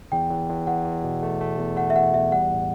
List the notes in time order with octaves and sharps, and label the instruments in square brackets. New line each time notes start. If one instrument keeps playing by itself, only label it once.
[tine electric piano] E2 [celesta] G5
[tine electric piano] E2
E2
[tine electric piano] E2 [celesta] F#5
[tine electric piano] E2
B2
A3
A3
E2
[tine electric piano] A3 [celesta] F#5
[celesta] E5
[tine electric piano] E2 [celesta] F#5
[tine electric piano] E2 [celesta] E5
[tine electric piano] G3 [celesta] F#5
[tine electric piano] A2